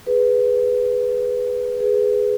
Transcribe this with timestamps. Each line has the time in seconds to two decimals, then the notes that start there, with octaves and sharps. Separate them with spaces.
0.07 G#4 B4
1.80 G#4 B4